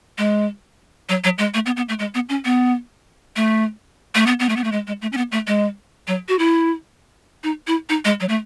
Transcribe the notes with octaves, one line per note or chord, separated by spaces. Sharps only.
G#3
F#3
F#3
G#3
A3
B3
B3
A3
G#3
B3
C#4
B3
A3
A3
B3
B3
A3
B3
A3
G#3
G#3
A3
C#4
B3
A3
G#3
F#3
F#4
E4
D#4
E4
D#4
G#3
F#3
A3